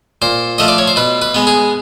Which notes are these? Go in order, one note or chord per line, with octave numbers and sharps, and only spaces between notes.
A#2 C5
F3 A3 D#5
D5
C#5
C5
B2 B4
B4
G#3 B3
G#4